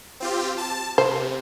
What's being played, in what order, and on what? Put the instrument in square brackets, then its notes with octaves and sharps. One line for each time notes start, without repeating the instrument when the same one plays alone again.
[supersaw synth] C4 F4 G4
A5
[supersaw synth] C3 [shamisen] C5